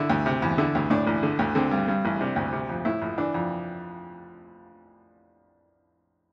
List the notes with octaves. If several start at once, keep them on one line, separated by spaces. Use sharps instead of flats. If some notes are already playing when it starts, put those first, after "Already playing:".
Already playing: D3 E4
D2
C3
E2
D3 E4
D2
A2 D4
A1
D3
D2
D3 C4
G2
G2
A1
C3 D4
D2
C3
F2
A2 E4
A#1
E3 D4
F2